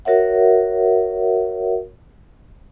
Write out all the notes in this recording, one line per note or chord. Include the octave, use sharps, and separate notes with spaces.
F#4 A#4 C#5 E5 F#5